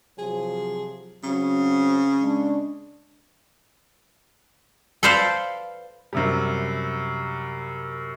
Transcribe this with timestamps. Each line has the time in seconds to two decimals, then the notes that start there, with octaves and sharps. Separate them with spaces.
0.19 C3 F3 F#3 G#4
1.24 C#3 F#3 C4
2.22 G#3 D4
5.03 A4 B4 C5 D5 F5
6.13 F#2 C3 G3